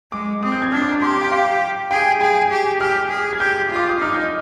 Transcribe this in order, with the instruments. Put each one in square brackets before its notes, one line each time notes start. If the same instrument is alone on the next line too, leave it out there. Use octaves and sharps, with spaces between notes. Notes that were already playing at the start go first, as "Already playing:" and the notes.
[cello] G#3 [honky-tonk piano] D6
[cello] C4 [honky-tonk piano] D#6
[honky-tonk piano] G6
G#6
[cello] D4 [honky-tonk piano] F6
[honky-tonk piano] D6
A#5
[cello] G4 [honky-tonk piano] C6
[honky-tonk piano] G5
F5
[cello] G#4 [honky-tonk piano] G5
[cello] G#4 [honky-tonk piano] G#5
[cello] G4
[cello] G4 [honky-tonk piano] F6
[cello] G#4
[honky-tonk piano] G#6
[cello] G4 [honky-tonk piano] G6
[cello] F4
[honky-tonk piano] D6
D#6
[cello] D#4 [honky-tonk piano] F6
[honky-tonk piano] G6